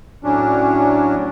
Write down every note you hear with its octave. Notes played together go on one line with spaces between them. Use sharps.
A2 F#3 C#4 D4